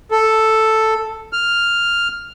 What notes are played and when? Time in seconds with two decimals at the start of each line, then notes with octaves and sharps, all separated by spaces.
0.11 A4
1.33 F6